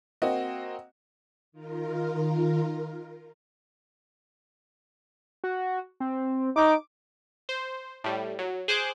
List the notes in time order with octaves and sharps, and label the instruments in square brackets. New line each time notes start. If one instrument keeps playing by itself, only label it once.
[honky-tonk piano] A#3 C4 F#4 D#5
[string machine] D#3 F4 A#4
[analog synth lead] F#4
C4
[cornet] D#4 [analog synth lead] D6
[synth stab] C5
A2 G3
F#3
G#4 C5 D6 F#6